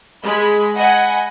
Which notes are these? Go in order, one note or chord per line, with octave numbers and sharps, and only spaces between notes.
G#3 B5
D#5 F#5 G#5 B5